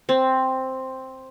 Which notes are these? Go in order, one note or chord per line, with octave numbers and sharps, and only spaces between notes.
C4